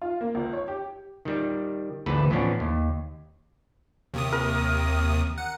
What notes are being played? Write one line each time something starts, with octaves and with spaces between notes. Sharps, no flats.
F4
A#3
C#2
C#5
G4
D#3 G3
G#1 D2 E3 A4 B4 A5
A2 E3 F3 B3 C#4 D4
D#2
D#2 C3 D#6
A#4
F#5